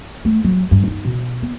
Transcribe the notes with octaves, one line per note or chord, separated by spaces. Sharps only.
A3
F#3
G2
D#4
B2
B3